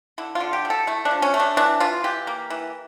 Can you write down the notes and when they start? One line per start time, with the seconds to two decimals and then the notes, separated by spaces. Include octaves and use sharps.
0.18 D3 E4
0.35 F4
0.40 D3
0.53 G4
0.65 D3
0.70 A4
0.87 A3 E4
1.05 D4
1.11 F3
1.22 C#4
1.34 A3
1.40 D4
1.57 E3 D4
1.80 E3 F4
2.04 E3 G4
2.27 A#3
2.50 E3